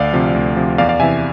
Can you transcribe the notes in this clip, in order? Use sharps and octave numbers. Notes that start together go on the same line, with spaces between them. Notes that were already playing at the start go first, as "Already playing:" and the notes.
Already playing: D2 D5 F5
C3 F3
D2
C3 F3
E2 D5 F5
D5 F5
C3 E3 E5 G#5